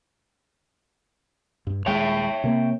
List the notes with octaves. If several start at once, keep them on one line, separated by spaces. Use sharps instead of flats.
G2
D#1 G#3 C#5 E5 G5
C3 A#3